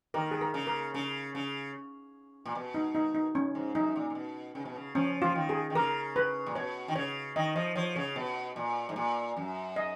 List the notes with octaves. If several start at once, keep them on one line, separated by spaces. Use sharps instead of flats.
D#3 A#4
G#4
A#4
C#3
A#4
C#3
C#3
A#2
B2
D#4
D#4
D#4
C#4
G#2
F#2 D#4
A#2
A#2
B2
C#3
B2
C#3
F3 C#4
F3 F4
D#3
G#4
D#3
C#3 A#4
B4
A#2
B2 C#5
D#3
C#3 C#5
D#3 D#5
F3 D#5
F3 C#5
C#3 C#5
B2
A#2
G#2
A#2
F#2
D#5